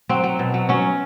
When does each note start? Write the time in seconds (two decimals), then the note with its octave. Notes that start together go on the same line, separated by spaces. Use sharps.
0.09 F#3 C4
0.24 F#3
0.39 B2
0.54 F#3
0.69 F#3 C#4